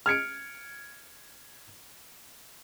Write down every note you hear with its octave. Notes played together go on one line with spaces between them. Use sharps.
F6 G#6 C#7 D7